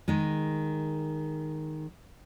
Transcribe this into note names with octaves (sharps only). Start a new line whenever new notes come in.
D#3 G#3